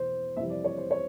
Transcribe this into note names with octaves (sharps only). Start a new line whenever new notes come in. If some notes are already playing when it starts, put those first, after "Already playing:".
Already playing: E2 B2 C5
F2 C3 E3 G3 E5
D5
C#5
C5
C#5